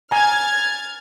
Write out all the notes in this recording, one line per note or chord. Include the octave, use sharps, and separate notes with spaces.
G#5 A#5 F6 G#6 A6